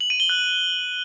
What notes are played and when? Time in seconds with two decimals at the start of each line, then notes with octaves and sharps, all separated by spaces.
0.01 F#7
0.10 D#7
0.20 G7
0.29 F#6